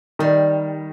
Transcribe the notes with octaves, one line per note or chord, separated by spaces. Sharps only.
D#3 G3